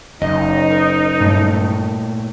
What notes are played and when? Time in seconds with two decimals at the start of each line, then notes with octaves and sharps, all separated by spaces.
0.22 F#1 D#4 D#5
0.71 A#4
1.20 G2 A#2 A3